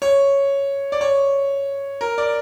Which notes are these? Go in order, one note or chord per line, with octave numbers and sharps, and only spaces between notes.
C#5
D5
C#5
A#4
D5